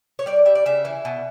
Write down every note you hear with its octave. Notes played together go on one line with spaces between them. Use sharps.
C#5
G3 D5
G3 E5
D5
C#3 E5
E3
B2